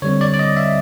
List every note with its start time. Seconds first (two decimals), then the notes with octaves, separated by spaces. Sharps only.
0.02 D3 G3 C4 C#5
0.21 D5
0.34 D5
0.39 D#5
0.57 E5